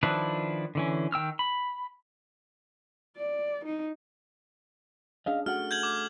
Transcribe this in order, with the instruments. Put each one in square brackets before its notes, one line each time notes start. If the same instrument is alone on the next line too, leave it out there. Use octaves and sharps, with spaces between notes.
[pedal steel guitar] D#3 F3 D4 E4 B4
D3 E3 C#4
D#3 G5 E6 F6
B5
[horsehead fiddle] D5
D#4
[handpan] C#4 D4 G#4 [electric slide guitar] D#5 F5
[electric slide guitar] A3 F#5 [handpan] F#4 [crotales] F6
[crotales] G6 G#6 F#7
D6